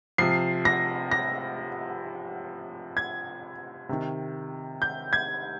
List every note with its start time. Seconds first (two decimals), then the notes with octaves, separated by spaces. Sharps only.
0.18 C3 F3 C7
0.65 A#6
1.12 A#6
2.97 G#6
3.89 C3 D#3
4.82 G6
5.13 G#6